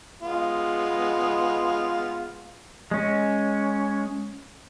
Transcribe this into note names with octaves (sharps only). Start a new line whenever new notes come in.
G#3 B3 F4
G#3 C#4